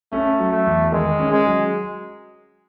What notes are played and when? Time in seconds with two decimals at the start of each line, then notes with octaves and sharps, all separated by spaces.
0.12 A3 C#4
0.39 F#3
0.52 A3
0.66 E2
0.92 D#3 G#3
1.19 C#4
1.32 G#3
1.46 F#3